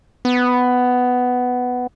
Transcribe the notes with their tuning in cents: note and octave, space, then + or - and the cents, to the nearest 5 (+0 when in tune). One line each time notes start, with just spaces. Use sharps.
B3 +10